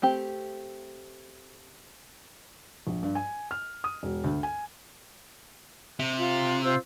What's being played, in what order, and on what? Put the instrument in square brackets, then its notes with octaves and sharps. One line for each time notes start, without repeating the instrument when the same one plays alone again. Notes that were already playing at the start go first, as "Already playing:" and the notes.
[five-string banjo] A3 C4 G4
[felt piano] A#1
G2
G#5
F6
D#6
E1
D2
G#5
[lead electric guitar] C3
[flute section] F4
F4 C5 E6